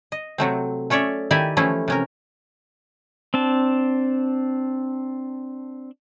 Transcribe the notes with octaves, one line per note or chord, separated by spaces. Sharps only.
D#5
C3 F#3 A3 C4
A3 C#4 C#5 D5 E5
D#3 E4 G4 D5 E5 G#5
E3 F3 A3 C#4 E4
C3 C#4 A#4
C4 D4 A5